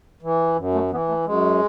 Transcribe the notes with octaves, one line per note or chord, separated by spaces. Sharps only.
E3
F#2
A3
E3 B3
A3
F#2 G#3